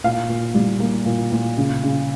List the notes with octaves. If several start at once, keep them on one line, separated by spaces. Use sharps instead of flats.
A#2 F5
A#2
G3
A#3
A#2
A#2
C#3
C#3